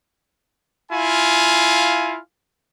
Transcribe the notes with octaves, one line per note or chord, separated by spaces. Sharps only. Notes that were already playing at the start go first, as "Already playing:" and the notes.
E4 F4 F5 G#5